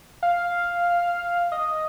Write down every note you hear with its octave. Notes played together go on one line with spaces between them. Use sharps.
F5
D#5